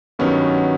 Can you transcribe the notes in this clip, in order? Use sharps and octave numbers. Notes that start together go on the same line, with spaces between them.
G2 D#3 F#3 B3 C#4